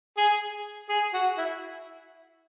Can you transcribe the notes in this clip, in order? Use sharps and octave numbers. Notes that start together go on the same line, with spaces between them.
G#4
G#4
F#4
E4